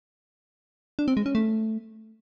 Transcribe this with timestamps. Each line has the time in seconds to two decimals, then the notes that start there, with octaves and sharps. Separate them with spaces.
0.99 D4
1.08 C4
1.17 G#3
1.26 C#4
1.35 A3